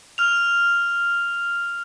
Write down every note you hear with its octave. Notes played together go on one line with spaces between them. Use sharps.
F6 F7